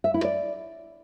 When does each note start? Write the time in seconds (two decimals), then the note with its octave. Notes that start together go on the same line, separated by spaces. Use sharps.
0.04 E5
0.14 E4
0.24 D5